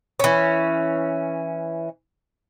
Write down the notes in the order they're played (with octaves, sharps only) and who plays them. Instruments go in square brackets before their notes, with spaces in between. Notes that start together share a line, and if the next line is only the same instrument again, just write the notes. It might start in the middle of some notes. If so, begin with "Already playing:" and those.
[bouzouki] E3 C#4